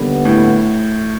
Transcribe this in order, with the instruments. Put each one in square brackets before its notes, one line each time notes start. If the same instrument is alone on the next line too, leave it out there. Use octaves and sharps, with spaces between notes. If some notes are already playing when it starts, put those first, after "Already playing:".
Already playing: [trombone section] D#2 D3 G3 B3
[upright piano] A2